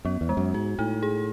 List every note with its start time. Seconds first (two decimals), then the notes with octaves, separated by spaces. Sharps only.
0.05 F#2 B3
0.21 E2
0.29 G#3
0.37 F#2
0.54 G#2 F#4
0.79 A2 D#4
1.03 G#4